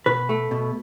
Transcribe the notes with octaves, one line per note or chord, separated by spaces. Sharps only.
B2 B4
A3
B2